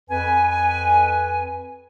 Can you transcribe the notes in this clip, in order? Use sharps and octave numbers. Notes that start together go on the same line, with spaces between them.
F2 B4 G#5